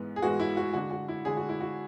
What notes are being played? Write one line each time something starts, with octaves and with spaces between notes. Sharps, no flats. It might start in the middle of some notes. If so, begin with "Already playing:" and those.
Already playing: G#2 E3 G#3 B3
G#4
G#2 E3 G#3 B3 F#4
E4
F#4
D3 G#3 D4 F#4
F#4
E4
D3 G#3 D4 G#4
F#4
E4
F#4